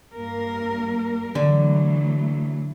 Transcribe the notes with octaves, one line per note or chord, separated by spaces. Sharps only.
G2 A#3 A#4
D3 E3 F#3 A3